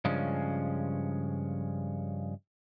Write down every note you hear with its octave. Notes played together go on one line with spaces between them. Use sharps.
G2 C#3 F3 G#3 C#4